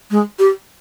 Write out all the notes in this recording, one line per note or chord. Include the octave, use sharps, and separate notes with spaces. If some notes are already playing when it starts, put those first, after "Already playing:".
G#3
G4